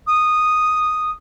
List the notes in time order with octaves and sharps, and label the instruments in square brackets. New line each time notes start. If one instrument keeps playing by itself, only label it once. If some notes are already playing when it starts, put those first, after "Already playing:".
[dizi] D#6